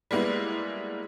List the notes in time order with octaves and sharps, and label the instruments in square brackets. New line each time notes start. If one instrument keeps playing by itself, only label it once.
[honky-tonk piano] G3 G#3 A#3 B3 E4